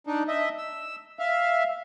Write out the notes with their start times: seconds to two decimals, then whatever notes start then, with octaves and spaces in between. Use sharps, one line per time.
0.07 D4 D#4
0.28 D#5 E5
0.58 E6
1.19 E5 F5